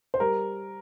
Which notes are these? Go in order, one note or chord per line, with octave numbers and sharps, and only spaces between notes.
C5
G3 A#4